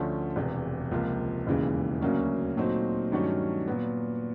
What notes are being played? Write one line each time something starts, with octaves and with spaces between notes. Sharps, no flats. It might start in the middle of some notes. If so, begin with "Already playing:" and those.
Already playing: D2 D3 F3 A3 C#4
E1 E2 C3
C#2 C3 F3 A#3
E1 D#2 C#3 E3 G#3
D2 C#3 F#3 A#3 C#4
A#2 F#3 A3 C4 D#4
G2 D#3 F#3 A3 C#4
A#2 F#3 B3